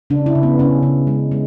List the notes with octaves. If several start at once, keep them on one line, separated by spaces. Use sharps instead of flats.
C#3 D4
E4
C#3
B3
C#3 C#4
C#3
G#3
G#3